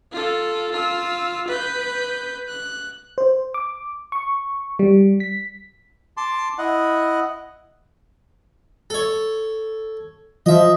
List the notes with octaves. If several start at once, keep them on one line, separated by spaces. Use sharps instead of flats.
F4 A4
F4 E6
B4 G6
F#6
C5
D6
C#6
G3
B6
A5 C6 D6
E4 D#5 F#5
A4 C#5
F3 D#5 E5